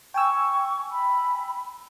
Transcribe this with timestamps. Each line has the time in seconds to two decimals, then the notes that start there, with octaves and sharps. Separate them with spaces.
0.14 G5 G#5 C#6 E6
0.91 B5